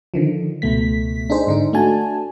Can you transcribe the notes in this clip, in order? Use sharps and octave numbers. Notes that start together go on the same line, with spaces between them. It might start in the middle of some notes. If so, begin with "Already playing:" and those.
D3 D#3 F3
C#2 B2 A3 B6
D4 D#4 G#4 C5
G#2 D3 D#4
A3 D4 F#4 G#5 A5